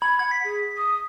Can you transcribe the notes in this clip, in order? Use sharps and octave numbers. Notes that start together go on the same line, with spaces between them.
B5 G#6
F#5 G#6
B6
G#4
D#6